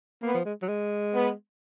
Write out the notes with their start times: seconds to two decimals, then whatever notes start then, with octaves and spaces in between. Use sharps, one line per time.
0.22 A#3 B3
0.34 F3
0.45 G#3
0.62 F#3
0.68 G#3
1.14 B3